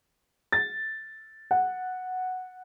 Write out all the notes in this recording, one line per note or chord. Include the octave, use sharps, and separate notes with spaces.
A6
F#5